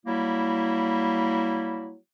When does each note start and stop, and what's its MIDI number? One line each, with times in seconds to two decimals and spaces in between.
0.06 1.95 54
0.06 1.95 55
0.06 1.95 58
0.06 1.95 64